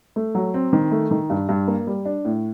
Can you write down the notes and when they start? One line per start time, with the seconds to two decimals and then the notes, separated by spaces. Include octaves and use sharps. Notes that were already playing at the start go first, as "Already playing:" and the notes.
0.16 A3
0.35 F#3
0.54 C4
0.73 D#3
0.91 A3
1.11 D#3
1.30 G2
1.49 G2
1.68 A#3
1.87 G3
2.05 D4
2.25 A2